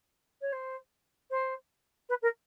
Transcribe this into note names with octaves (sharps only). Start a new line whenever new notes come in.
C#5
C5
C5
B4
A#4